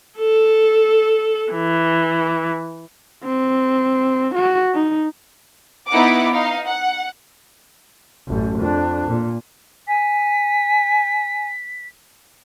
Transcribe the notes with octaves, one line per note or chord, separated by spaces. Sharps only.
A4
E3
C4
F#4
D#4
B3 D#4 E4 F#5 D6
D#4 F5
F#5
A1 F#2
F2 D4
A#2
G#5 B6